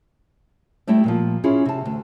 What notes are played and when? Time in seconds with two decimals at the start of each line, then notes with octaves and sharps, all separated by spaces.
0.87 G3 A3 E4 G4 D#5 G5
1.04 A#2 E3 F3
1.44 C#4 E4 F4 G#4
1.66 C3 A5
1.85 D2